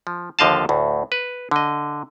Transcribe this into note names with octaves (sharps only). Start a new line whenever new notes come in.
F3
D#2 D3 F3 D#5 F5 A5
D2 A2
B4
D3 D#5